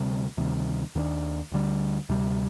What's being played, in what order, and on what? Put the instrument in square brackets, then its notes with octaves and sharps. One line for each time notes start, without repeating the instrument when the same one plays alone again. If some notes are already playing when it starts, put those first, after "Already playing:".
Already playing: [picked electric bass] D2 C3 G3
D2 C3 D#3 G3
D#2 D#3 B3 D4
D2 D3 G3
D2 C3 G3